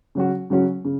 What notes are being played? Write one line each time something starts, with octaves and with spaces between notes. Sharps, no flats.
C#3 F#3 C#4 F#4
C#3 F#3 C#4 F#4
C#3